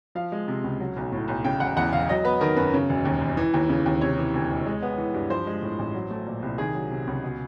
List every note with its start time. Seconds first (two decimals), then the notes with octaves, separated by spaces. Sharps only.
0.15 F3 F5
0.32 G#3
0.48 C3
0.64 C#2
0.80 F#3
0.97 B1
1.12 A2
1.28 B1
1.45 C#3 G5
1.60 E1 F#5
1.77 E2 F#5
1.93 E1 F5
2.09 F#3 D#5
2.25 B3 B4
2.41 D#3 A#4
2.57 F#2 B4
2.74 C#3
2.89 E1
3.05 D#2
3.21 E1
3.37 E3
3.54 D#2
3.70 C#3
3.86 D#2
4.01 C3 C#5
4.18 E3
4.34 D2
4.50 E1
4.66 G#3
4.82 B3
4.98 E3
5.14 G2
5.30 F3 C5
5.47 G#3
5.62 A2
5.79 A1
5.94 F#3
6.11 A3
6.26 A#2
6.42 C2
6.58 D#3 G#4
6.74 F#3
6.90 C3
7.07 C#2
7.24 B2